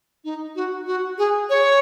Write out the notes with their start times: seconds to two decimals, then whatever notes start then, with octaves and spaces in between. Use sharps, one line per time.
0.24 D#4
0.56 F#4
0.87 F#4
1.18 G#4
1.50 C#5